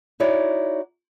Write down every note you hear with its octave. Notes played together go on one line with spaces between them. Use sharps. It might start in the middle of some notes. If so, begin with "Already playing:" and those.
D#4 E4 F#4 C#5 D5